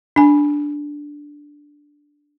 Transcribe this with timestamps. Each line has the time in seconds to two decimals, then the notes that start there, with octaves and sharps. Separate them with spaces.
0.16 D4 G#5